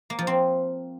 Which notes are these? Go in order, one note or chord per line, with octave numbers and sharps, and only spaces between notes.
A#3
F3
C4